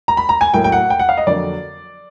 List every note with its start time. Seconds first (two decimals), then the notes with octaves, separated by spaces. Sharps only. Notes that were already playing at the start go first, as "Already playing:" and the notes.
0.08 A#5
0.17 B5
0.29 A#5
0.41 G#5
0.54 A2 F#3 A#3 G5
0.64 G5
0.72 F#5
0.90 G5
0.99 F#5
1.09 F5
1.18 D#5
1.27 F2 D3 F#3 A#3 D5